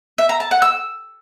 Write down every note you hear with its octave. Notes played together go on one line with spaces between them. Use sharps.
E5
A#5
A5
F#5
E6